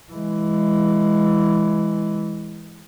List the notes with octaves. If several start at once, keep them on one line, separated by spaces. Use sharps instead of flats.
E3 G#3